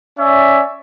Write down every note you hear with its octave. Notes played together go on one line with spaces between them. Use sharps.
C#4 D5 E5